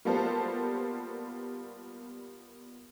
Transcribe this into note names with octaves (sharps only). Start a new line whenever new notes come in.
G3 A#3 B3 F4 A4 C5